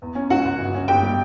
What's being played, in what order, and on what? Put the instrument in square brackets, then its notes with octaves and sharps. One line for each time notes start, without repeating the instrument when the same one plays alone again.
[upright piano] E2
C#4
C#2 F#4 F#5
C#2
G1
C#4
G1 G4 G5
G3